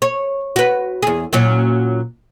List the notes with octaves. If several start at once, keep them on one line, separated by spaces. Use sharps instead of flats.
C#5
F#4 B4
E2 G#4
A#2 F#3 C#4